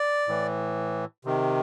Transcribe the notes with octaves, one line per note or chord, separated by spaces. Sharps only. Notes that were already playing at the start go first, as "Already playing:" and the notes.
Already playing: D5
A2 E3
C3 D#3